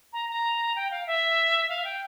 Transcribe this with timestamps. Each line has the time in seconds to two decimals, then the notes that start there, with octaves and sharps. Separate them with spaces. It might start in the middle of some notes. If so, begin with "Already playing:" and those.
0.13 A#5
0.29 A#5
0.76 G5
0.91 F5
1.07 E5
1.69 F5
1.85 G5